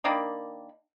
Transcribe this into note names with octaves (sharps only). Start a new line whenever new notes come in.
D#3 A#3 D4 B5